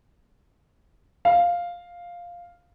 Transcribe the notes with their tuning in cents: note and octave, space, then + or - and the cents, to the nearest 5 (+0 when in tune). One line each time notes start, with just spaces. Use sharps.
F5 +0